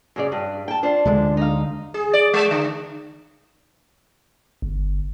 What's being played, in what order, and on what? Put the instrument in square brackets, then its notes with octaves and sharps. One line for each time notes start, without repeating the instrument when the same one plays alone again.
[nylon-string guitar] F#2 C#3 D5
G2
G5 A5
D4 F4 C5
[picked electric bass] D2 D3 G#3
[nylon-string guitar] D#4 F5
[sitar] G#4
D5
G#3
D3
[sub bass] G1